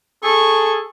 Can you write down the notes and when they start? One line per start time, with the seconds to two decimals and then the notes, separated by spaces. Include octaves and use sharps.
0.24 G#4 A4 C#6